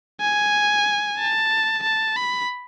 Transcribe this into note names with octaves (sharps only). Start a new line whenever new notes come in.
G#5
A5
A5
B5